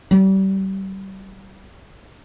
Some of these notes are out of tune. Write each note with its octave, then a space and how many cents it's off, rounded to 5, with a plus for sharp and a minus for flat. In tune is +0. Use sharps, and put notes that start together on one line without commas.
G3 -30